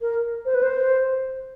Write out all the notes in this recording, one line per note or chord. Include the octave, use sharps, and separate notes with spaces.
A#4
C5
B4
C5